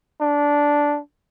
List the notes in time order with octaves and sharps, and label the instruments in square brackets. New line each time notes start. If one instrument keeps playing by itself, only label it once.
[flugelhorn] D4